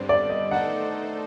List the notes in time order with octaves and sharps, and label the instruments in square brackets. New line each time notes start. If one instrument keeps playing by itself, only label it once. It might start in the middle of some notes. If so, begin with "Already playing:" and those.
Already playing: [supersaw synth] G2 D3 G3 C4 [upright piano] C5
[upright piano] D5
D#5
[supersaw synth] A3 D#4 A4 C5 [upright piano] F#5